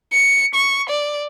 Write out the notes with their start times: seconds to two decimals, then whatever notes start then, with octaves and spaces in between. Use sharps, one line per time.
0.13 C#7
0.54 C#6
0.89 D5